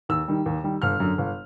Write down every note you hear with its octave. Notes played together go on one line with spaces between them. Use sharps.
D#2 E6
D#3 G3
D#2
D#3 G3
G1 F6
F#2 D3
G1